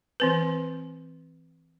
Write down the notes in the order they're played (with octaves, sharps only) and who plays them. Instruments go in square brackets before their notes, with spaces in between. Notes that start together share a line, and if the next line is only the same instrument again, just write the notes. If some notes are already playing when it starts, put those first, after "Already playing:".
[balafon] E3 C4 B4